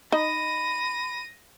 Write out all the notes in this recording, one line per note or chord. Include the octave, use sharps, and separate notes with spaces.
D#4 D#5 B5 A#6 D#7